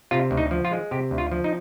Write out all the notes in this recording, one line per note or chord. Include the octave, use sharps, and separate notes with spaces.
C3 F4
D2
D#4
F3
F4
G#3
C3 G4
D2
F4
F3
D#4